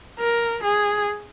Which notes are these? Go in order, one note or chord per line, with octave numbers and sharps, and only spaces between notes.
A#4
G#4